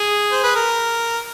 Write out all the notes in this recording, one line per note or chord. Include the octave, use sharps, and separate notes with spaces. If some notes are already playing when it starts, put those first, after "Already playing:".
Already playing: G#4
C5
B4
A#4